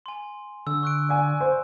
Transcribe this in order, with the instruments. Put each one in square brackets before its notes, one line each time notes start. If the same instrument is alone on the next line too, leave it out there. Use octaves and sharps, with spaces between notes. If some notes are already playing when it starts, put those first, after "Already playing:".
[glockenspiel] G#5 C6
[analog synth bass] D3 [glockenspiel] E6
[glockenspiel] C#6 F#6 D7
[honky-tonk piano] D5 G#5
C5